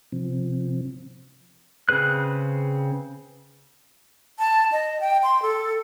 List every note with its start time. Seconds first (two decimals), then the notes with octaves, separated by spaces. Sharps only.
0.12 C3 F3 C4
1.89 C#3 C4 G#4 B4 F#6
4.39 A5
4.72 D#5
5.00 G5
5.23 C6
5.42 A4